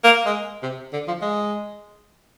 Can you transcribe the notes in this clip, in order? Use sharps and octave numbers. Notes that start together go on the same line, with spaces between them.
A#3
G#3
C3
D3
F3
G#3